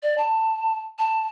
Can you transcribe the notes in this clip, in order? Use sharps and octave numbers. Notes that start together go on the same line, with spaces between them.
D5
A5
A5